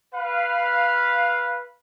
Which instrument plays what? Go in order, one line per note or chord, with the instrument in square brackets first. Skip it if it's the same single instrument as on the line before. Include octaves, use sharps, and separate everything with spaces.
[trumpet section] B4 F5